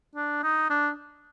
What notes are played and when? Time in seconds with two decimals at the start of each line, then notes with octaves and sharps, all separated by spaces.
0.15 D4
0.43 D#4
0.70 D4